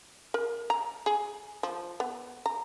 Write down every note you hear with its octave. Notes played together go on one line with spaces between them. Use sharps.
A#4
A#5
G#4
F3
B3
A#5